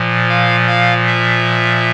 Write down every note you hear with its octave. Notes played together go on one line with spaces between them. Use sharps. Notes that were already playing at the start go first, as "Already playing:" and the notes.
Already playing: A#2 F3
F5
F5
E5